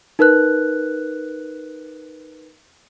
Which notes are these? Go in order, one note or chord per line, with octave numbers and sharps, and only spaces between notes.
D#4 A#4 B4 F#6